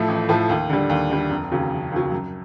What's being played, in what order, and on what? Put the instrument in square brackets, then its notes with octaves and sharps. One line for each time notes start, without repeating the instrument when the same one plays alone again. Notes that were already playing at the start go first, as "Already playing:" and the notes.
Already playing: [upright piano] A2 F3 A3
A1
A2 F3 A3
D#2
D3 G3
D#2
D3 G3
F1
D#2 C#3 F#3
F1
D#2 C#3 F#3
F#2